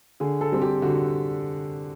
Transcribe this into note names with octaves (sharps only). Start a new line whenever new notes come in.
D3 G#4
A4
G3 C4
G4
D3 F#4